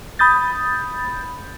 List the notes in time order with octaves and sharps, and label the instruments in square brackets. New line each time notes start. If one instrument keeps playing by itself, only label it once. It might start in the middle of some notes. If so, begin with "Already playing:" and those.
[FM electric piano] B5 D#6 G6 A6